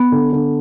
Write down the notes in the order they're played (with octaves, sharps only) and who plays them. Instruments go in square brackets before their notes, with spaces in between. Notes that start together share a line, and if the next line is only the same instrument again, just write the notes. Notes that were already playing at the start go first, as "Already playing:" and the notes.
Already playing: [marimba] B3
[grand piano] D3
D3